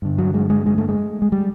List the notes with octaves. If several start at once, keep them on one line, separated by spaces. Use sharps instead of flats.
G2 D3
F#3
G#3
G#3
G#3
A3
G#3
G#3
G3